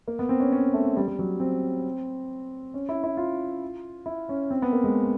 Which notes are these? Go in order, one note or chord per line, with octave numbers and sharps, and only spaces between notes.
A#3
B3
C4
C#4
C#4
A3
G3
G3
F#3
C4
C#4
E4
E4
F4
E4
C#4
C4
B3
A#3
G#3